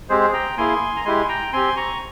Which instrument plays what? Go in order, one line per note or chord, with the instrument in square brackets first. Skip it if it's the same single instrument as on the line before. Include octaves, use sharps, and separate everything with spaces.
[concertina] G#3 C4 G4 G#4 C5
G5 A#5
A#3 E4 G#4 G#5 C6
A#5
G#3 E4 G4 G#5 C6
G5 A#5
C4 G4 G#5 C6
A#5 C#6